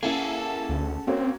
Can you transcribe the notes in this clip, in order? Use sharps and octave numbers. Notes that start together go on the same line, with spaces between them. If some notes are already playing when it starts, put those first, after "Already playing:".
A#3 C#4 E4 G#4 A4 F#5 A5
D2
A#3 C4 C#4 F#4